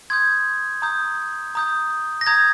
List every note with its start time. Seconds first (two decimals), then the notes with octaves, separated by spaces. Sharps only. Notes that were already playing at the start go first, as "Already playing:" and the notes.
0.10 C6 D#6 G6 G#6
0.82 A#5 D#6 G6
1.55 A#5 D#6 G6
2.21 A#6
2.27 A#5 D#6 G6 G#6